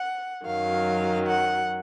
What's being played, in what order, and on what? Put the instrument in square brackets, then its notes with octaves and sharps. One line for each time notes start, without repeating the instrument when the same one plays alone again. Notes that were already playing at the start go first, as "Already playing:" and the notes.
Already playing: [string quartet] F#5
F#2 D#3 F#3 F5
F#5